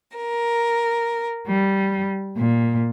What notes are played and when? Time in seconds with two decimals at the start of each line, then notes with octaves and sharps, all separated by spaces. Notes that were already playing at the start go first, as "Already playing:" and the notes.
0.17 A#4
1.46 G3
2.37 A#2